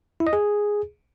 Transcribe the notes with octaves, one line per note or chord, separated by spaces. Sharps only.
E4
D#5
G#4